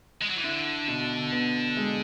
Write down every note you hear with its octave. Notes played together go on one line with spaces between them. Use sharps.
G#3
F#3
E3
D3 E4
B2
B3
G#3